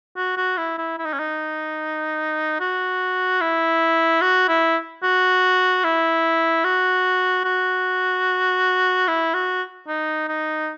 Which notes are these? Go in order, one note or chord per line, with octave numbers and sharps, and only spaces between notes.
F#4
F#4
E4
E4
E4
D#4
C#4
D#4
F#4
E4
F#4
E4
F#4
E4
F#4
F#4
E4
F#4
D#4
D#4